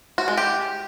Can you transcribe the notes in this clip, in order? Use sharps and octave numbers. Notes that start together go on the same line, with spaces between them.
F#4
G#3
G4